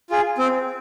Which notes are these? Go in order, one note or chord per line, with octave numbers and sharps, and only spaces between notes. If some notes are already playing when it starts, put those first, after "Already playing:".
F4 G#4
C4